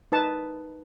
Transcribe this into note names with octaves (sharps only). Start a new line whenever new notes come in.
D#4 B4 A5